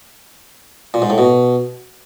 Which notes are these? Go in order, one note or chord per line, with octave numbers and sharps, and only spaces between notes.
A#2
G#2
A2
B2